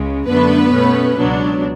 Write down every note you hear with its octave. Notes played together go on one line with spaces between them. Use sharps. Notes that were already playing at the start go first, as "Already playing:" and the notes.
Already playing: C#2 C#3 G#3
F#2 D3 A3 B3 D4 B4
B2 A3 C#4
C#2 B2 F#3 B3 D4